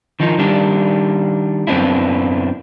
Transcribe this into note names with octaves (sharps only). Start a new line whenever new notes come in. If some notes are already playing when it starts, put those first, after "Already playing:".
D#3 F3 D#4
D#3 G3 D4
F#2 B3 C4 D4 E4